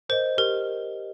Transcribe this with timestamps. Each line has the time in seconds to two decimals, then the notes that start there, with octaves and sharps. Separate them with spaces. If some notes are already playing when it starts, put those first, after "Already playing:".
0.09 A#4 C5 D#5
0.37 G4 A#4